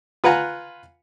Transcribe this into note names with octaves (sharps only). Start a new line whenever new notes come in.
F4 B4 F#5 G#5 A#5